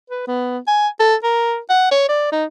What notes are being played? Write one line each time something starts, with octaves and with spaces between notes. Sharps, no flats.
B4
B3
G#5
A4
A#4
F#5
C#5
D5
D#4